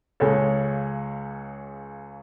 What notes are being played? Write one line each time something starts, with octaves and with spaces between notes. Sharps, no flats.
C#2 C#3 G#3 A4 C#5